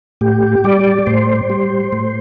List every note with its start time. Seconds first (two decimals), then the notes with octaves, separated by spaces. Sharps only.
0.21 A2 G4
0.64 G3 D5
1.07 A2 C5
1.50 G3
1.92 A2